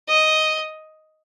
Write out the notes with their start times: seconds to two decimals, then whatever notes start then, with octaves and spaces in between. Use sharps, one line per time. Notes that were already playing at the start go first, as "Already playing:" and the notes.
0.08 D#5